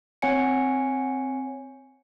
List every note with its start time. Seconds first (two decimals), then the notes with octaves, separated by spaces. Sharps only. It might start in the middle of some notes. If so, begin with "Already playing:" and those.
0.22 C4 C#5 F#5 G#5 C#7